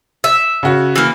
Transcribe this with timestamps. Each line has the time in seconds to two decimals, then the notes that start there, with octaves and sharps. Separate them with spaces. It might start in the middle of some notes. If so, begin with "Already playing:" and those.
0.24 E5
0.63 C#3 F#4
0.96 E3 A#3